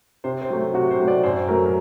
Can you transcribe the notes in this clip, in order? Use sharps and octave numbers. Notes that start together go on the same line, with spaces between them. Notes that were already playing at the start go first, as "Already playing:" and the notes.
C3 C5
C5
F#3 A3
C3 F#4
C5
F#3 A3
D5
F#2 C5
F#3 A3 A#4
A#4